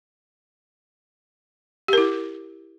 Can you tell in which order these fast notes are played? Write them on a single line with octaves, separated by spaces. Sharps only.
G4 A#4 E4